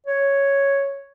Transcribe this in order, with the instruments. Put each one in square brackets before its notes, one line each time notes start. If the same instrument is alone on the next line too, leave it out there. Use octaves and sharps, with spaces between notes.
[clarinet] C#5